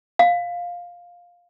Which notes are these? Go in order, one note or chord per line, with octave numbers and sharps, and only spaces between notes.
F5